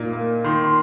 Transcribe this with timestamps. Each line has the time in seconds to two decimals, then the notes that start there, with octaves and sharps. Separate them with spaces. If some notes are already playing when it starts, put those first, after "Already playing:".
Already playing: A#2 A#3 D#4
0.13 A#3
0.44 D#3 C6
0.64 C6